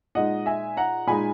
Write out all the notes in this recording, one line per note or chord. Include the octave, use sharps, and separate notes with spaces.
A#2 G#3 D#4 D#5 F#5
E5 G#5
F#5 A#5
A#2 G#3 D#4 G#5 B5